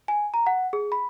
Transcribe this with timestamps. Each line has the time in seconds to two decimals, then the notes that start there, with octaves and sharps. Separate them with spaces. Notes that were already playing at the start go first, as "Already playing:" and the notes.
0.08 G#5
0.34 A#5
0.47 F#5
0.73 G#4
0.92 B5